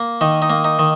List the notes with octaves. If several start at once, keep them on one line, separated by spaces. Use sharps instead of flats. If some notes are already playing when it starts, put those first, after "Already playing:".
Already playing: A#3
D#3 D#4
D#4
A#3
D#4
D#3